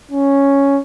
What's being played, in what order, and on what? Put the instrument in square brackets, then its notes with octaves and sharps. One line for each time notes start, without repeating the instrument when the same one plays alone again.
[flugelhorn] C#4